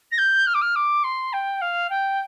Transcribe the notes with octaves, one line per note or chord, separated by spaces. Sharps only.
A#6
G6
F6
D6
F6
D6
C6
G5
F5
G5